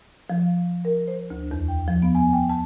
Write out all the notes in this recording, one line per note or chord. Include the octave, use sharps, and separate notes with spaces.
F3
A#4
C5
D2
E2
G5
F3
B3
G#5
G5
A5